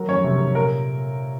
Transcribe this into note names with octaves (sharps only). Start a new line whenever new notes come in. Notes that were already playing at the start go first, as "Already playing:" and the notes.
Already playing: F#3 A#4
F2 C#4 C#5
C3
C3
A#2 A#4